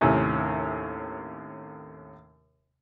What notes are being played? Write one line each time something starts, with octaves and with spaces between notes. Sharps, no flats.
D#2 A2 C3 C#4 E5